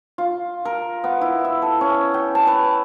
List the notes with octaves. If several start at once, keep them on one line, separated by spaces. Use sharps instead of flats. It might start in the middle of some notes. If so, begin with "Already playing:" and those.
F4
A#4
B3
E4
E5
A4
C#4
G5
A5
B4